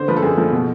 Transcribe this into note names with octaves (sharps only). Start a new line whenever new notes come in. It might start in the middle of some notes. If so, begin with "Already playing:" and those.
Already playing: D3 C5
F3 B4
A4
F#2 G#4
F3 A4
B2